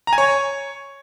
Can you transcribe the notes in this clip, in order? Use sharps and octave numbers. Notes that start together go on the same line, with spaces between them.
A#5
G#5
C#5